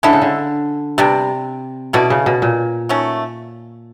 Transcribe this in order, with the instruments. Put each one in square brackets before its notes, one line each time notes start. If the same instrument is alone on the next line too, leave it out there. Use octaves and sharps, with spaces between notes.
[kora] D3 [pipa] G#3 C#4 E4 A4
[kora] C#3
D3
[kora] C3 [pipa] G3 B3 D4
[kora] B2 [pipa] C#4 E4 A4 D5
[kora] C#3
B2
A#2
[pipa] D#3 F#3 A3 C#4